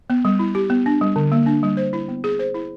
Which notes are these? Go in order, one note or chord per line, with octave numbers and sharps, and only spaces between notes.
B3
G3
E4
G4
B3
D4
G3
D3
A#3
D4
G3
C5
E4
B3
G#4
C5
E4